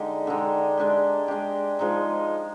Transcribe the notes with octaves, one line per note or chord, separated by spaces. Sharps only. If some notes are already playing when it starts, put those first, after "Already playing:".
Already playing: D3 G#3 D#4 G4
D3 G#3 D#4 G4
G#3 D4 G4
G#3 D4 G4
F3 G#3 D#4